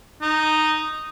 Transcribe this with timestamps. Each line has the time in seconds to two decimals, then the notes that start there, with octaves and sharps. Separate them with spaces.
0.22 D#4